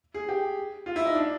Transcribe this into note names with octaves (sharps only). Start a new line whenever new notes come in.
G#4
G4
F4
E4
D#4
D4